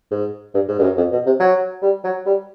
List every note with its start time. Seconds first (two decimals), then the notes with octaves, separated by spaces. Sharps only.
0.11 G#2
0.54 G2
0.68 G#2
0.79 G2
0.83 F#2
0.97 F2
1.12 B2
1.26 C3
1.40 F#3
1.82 G3
2.04 F#3
2.26 G3